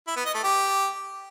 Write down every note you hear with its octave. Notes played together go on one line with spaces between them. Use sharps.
E4
B3
D#5
A3
G4